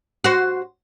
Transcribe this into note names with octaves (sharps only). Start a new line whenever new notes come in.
F#4 C5